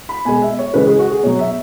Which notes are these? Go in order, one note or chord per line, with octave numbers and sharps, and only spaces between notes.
B5
B2 G#3 G#5
E5
C#5
C#3 E3 G#3 B4
G#4
F#4
G#4
B2 F#3 C#5
E5